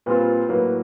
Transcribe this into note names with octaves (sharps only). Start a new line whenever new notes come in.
A#2 G3 C4 F4 B4
A2 F#3 A#3 B4